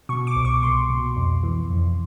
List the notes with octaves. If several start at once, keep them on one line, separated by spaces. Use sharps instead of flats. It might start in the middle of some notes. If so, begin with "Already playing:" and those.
B2 C#6
D6
C2
C#6
C2 C6
B2
F2
E3
F2